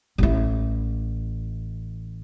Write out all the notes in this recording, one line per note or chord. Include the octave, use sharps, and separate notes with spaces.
A1 E4